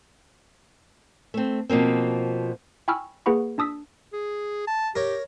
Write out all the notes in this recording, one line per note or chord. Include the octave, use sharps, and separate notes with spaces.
A3 C4
B2 F3 A#3 C4
G5 G#5 B5 C#6 E6 F6
A#3 G#4 B4 F#5 B5 C#6
D4 A5 D#6 E6 B6
G#4
A5
G4 A#4 C#5